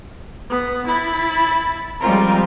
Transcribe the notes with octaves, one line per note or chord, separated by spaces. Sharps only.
B3
E4 B5 A6
F3 G3 G#3 C4 F4 A#4